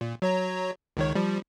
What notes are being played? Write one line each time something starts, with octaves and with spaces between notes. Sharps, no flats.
A#2
F#3 C#5 A#5
C#2 D#3 C#5
F3 G3